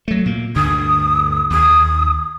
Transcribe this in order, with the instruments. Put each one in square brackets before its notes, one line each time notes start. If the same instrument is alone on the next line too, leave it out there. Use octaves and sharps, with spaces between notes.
[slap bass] F#3 A3
A#2 A#3
[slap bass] D2 G2 D3 [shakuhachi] D#6
[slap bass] D#2 [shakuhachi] D#6